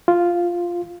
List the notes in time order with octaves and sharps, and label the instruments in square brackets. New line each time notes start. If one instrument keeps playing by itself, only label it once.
[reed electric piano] F4